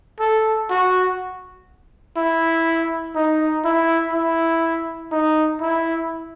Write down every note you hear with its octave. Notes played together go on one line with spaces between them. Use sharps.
A4
F#4
E4
D#4
E4
E4
D#4
E4